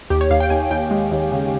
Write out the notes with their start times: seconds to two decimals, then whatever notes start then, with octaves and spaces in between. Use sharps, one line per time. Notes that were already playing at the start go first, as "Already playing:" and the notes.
0.10 D#2 G4
0.21 C#5
0.30 D#2 F5
0.40 G5
0.50 D#2 G#5
0.71 D#2 G5
0.91 G#3
1.11 D#2
1.32 C#3